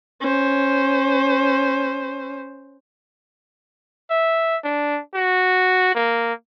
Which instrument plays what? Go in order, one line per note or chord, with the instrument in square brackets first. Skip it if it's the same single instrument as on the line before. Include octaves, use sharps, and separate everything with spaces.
[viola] C#4 C5
[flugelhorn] E5
D4
F#4
A#3